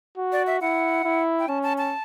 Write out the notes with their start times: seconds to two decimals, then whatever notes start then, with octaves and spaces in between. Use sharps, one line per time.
0.18 F#4
0.32 D5
0.47 E5
0.61 E4 F#5
1.04 E4
1.39 G5
1.48 C#4 A5
1.63 A5
1.78 A5